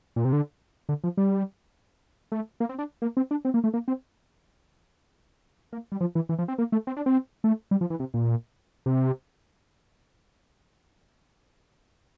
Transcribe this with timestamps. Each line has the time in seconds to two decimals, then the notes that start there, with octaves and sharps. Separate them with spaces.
0.16 A#2
0.25 C3
0.33 D3
0.89 D3
1.04 F3
1.17 G3
2.32 A3
2.60 A#3
2.69 C4
2.79 D4
3.02 A#3
3.17 C4
3.31 D4
3.45 C4
3.54 A#3
3.64 A3
3.74 A#3
3.88 C4
5.73 A#3
5.92 G3
6.01 F3
6.15 E3
6.29 E3
6.38 F3
6.48 C4
6.58 A#3
6.72 A3
6.87 C4
6.97 D4
7.06 C4
7.44 A3
7.71 G3
7.81 F3
7.90 E3
8.00 C3
8.14 A#2
8.86 C3